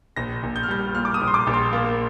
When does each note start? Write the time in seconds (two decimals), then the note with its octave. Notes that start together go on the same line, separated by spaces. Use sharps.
0.16 A#1 A#6
0.43 A#1
0.56 G6
0.63 F6
0.68 G3 G6
0.95 A#2 F6
1.05 D6
1.14 D#6
1.21 A#1
1.27 C6
1.34 D6
1.47 A#1
1.54 C6
1.73 A#3